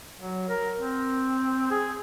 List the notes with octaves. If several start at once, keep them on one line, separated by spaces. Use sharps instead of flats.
F#3
A#4
C4
G#4